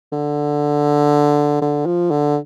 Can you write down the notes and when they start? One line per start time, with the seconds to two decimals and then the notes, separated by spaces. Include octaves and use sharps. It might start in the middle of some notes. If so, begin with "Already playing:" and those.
0.12 D3
1.61 D3
1.86 F3
2.11 D3